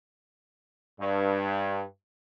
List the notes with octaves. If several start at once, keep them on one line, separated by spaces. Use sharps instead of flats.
G2